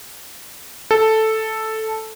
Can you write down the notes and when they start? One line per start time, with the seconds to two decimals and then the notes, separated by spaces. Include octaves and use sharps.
0.91 A4